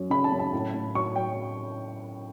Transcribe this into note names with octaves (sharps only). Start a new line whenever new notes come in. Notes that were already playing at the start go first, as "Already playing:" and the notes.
Already playing: F#2 F#3
C#3 B5
A5
F#2
A5
A2
A2
F#3 C#6
F#3 G5